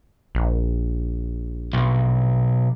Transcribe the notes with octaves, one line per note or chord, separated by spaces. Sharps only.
A#1
B1